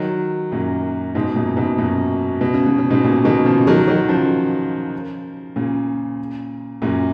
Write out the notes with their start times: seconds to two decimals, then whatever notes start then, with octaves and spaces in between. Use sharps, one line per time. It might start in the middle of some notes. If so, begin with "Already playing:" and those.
Already playing: D#3 F#3
0.52 F#2 A#2
1.15 G#2 B2
1.36 F#2 A#2
1.57 G#2 B2
1.78 F#2 A#2
2.41 B2
2.54 C#3
2.66 B2
2.78 C#3
2.91 G#2 B2
3.04 A#2 C#3
3.25 B2 D#3
3.45 C#3 F3
3.67 D#3 F#3
3.88 D#3 F#3
4.09 C#3 F3
5.56 A#2 C#3
6.82 F#2 A#2